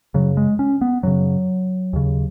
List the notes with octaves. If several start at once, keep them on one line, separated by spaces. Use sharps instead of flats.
F#2 C#3 F#3
G#3
C#4
B3
F#2 C#3 F#3
D#2 C#3